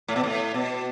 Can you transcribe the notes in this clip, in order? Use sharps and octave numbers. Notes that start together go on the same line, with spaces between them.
A2
B2
A2
B2